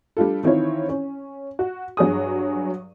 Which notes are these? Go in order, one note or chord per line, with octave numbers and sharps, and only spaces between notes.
G3 D4 F4 A4
D#3 E3 C4 E4 F4 C#5
C#4
F#4
G2 F#3 G#4 D#6